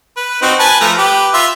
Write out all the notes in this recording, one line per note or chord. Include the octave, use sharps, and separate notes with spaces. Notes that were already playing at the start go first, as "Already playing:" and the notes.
B4
C4 D#4 F#4
B4 G#5 A5
F3 A3 A#5
G4 B4
F4 E5 C6